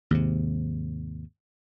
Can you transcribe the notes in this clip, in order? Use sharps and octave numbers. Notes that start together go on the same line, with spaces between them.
D#2 G#2 C3